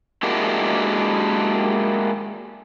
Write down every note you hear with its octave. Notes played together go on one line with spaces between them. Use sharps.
G#3 A#3 D4 E4 F#4 G4